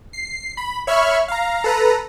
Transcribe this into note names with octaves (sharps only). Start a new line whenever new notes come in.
C7
B5
C#5 E5 B5 C#6 F6
F5 A#5
A4 B4 A#5